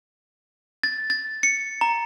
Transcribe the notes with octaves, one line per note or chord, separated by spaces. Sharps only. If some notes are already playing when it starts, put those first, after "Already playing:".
A6
A6
C#7
A#5